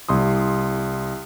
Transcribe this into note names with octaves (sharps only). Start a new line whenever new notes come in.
C2 C6 D#6